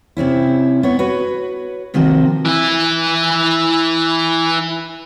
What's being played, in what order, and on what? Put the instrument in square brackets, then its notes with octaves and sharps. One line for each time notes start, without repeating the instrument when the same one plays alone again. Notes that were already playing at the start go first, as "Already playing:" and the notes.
[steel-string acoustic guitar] C3 C4 C#4 E4
B3 C#5
F#4 B4 C#5
C3 D#3 F3 A#3 C4 F#4
[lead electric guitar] E3 E4